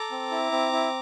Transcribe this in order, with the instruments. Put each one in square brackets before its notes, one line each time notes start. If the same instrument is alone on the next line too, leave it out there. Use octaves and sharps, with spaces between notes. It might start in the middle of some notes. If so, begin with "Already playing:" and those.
Already playing: [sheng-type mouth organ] A4 A#5 D6
C4
E4
C4
E4